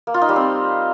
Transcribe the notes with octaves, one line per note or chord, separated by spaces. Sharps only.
A#3
F4
D#4
G3
C4